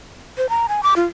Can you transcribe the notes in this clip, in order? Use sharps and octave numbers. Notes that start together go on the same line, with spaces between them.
C5
A#5
G#5
D6
F4